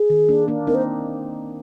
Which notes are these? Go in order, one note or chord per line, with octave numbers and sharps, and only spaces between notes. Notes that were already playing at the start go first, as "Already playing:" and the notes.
Already playing: G#4
D#3
A#3 D4
A#3 D4
C4 D#4 A#4
C5